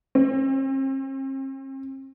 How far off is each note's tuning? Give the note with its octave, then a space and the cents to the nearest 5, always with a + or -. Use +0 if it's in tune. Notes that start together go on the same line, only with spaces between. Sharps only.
C4 +35